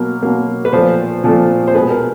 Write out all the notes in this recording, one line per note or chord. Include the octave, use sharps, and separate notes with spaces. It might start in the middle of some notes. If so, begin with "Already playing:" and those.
Already playing: B2 F#3 A#3 A#4
B2 F#3 A#3
B4
A#2 F3 A3 C5
A#2 F3 A3
C5
B2 G#3 B4
A#4